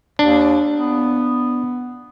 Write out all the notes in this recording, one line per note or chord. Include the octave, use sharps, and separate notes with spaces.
D#2 D4
B3